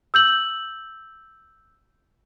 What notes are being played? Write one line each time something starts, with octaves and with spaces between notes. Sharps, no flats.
E6 G6 F#7